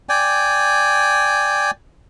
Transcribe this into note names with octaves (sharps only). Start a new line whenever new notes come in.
D5 G5 G#5